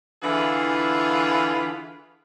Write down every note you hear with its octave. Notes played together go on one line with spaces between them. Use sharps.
D3 E3 E4 F4 G#4